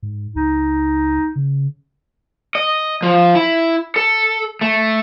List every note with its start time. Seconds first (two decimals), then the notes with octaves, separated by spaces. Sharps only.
0.03 G#2
0.35 C#2 D#4
1.36 C#3
2.55 D#5
3.02 F3
3.35 E4
3.96 A4
4.61 A3